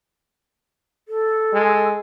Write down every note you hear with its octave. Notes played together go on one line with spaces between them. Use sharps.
A4
G#3